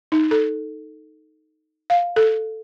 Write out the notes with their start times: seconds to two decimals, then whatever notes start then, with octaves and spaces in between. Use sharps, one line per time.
0.12 D#4
0.31 A4
1.90 F5
2.16 A4